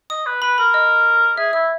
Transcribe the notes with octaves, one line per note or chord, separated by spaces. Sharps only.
D#5 D#6
B4
B4 B5
A#4 B5
D#5
G#4 E5
E4 E5